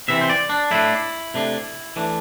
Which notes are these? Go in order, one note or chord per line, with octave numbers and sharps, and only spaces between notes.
C3 E3 C4 E5
C5
D5
D4
A2 A3 D4 E4
C3 A3 D4
E3 A3 D4